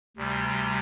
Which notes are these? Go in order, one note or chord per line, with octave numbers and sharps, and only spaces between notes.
D2 C3 G3